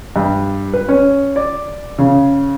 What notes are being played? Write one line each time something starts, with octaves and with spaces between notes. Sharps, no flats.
G2
B4
C#4
D5
C#3